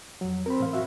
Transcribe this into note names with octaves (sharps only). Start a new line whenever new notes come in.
F2 F#3
C4 A#4 B5
A2 E3 F5
F#4 E5 F5